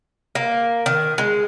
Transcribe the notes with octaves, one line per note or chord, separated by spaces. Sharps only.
A#3
D#3
G#3